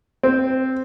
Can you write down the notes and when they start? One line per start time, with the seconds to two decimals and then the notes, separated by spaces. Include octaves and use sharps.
0.23 C4